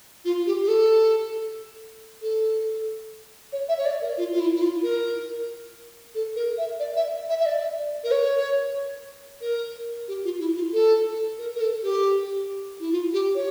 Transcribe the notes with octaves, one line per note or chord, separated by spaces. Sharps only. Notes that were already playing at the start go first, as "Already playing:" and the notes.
F4
G4
G4
A4
A4
C#5
E5
C#5
D5
A#4
F4
F4
E4
E4
F4
A#4
A4
A#4
E5
D5
E5
E5
E5
D5
A#4
C#5
A#4
G4
F4
E4
F4
A4
A#4
A#4
A4
G4
E4
F4
G4
C#5